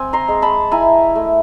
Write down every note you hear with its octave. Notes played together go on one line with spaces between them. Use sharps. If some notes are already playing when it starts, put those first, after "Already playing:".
Already playing: C4 G#5
A#5 C6
G#3
A5 B5
E4 G#5 A#5
A3